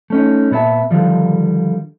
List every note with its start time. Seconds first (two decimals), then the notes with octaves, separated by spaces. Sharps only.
0.10 A3 C#4 D#4
0.51 A#2 B3 G#4 E5 A5
0.91 D3 D#3 F3 G3